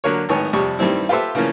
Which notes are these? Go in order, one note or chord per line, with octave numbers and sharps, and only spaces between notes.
D3 F#3 A#3 A#4 C#5
G#1 A2 D#3 B3 C#5 G#5
F2 C3 G3 C#6 D#6
G2 D#3 G3 C4 E4
F4 G4 A4 B4 C5 E5
C#3 E3 F3 A#3 C#4